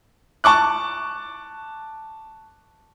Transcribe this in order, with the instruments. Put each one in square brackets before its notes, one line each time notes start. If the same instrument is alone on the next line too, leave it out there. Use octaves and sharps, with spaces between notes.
[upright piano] A5 C#6 D6 F#6